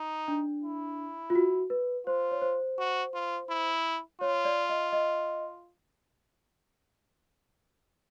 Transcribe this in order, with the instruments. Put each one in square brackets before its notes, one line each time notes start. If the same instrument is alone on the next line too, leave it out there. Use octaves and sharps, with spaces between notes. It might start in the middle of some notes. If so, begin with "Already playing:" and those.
Already playing: [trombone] D#4
[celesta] D4
[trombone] E4
[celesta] F4
F#4
B4
[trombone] F4 [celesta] C5
[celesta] C#5
C5
[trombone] F#4
F4
E4
[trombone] F4 [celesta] C#5
[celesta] C#5
D5
D#5
D#5